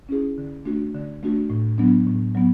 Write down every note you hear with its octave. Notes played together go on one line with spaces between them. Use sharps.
C#4 E4 G#4
D3
A3 D4 F#4
D3
A3 D4 F#4
A2
F#3 B3 D4
A2
F#3 B3